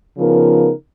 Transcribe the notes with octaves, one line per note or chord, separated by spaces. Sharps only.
C#3 F3 B3 D#4 A#4